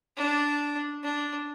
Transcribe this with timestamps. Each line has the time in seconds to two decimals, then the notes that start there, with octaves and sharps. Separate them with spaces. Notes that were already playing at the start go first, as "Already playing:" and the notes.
0.17 D4
1.04 D4